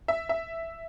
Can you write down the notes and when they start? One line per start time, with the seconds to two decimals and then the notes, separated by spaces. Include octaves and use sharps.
0.08 E5
0.29 E5